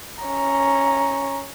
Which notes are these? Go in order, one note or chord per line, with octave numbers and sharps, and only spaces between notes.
C#4 A#5